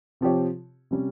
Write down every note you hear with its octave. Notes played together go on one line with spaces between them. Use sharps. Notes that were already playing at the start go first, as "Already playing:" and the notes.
C3 F3 C4 G4 C#5
C3 G3 C#4